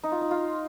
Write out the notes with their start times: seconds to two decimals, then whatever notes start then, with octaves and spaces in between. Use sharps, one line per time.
0.04 D#4
0.12 F4
0.21 D#4
0.31 F4